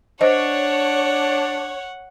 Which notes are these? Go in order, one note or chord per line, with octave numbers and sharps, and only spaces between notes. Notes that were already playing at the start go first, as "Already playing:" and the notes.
D4 C5 C#5 D#5 F#5